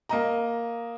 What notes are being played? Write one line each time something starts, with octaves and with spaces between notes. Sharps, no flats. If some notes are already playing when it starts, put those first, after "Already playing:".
A#3 D#5 A#5